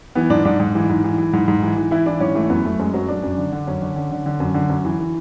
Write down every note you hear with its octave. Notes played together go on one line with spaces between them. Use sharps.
E3 B3
G#2 D4
G#2 D4
G#2
E3
G#2
E3
E3
G#2
G#2
E3
E3
E3 E4
E3 D4
G#2 C#4
E3 A3
F#2 B3
F#2 A3
F#2 G#3
F#2 F#3
F#2 D4
F#2
D3
D3
F#2 C#4
D3
D3
D3
D3
F#2
D3
F#2
E3
E3